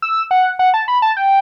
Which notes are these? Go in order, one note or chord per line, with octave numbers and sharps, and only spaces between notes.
E6
F#5
F#5
A5
B5
A5
G5